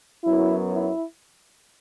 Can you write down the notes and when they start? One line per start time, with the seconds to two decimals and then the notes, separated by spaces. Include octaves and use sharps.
0.24 F#2 F#3 B3 E4
0.71 E4